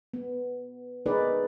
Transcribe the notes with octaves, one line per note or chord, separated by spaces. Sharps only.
B3
B3 D#4 G#4 A#4 B4 D5